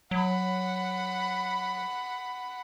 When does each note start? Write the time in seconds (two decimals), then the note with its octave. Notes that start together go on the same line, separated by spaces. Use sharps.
0.11 F#3 F#5 B5